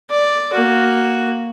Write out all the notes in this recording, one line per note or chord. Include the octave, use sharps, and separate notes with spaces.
D5
A#3 F#4